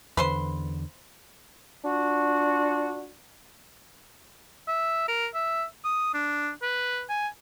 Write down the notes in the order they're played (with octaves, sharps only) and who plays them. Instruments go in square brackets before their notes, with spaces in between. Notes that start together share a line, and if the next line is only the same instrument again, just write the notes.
[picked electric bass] E2 D3 [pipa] B4 C5 C6
[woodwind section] D4 F4 F#4
[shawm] E5
A#4
E5
D#6
D4
B4
G#5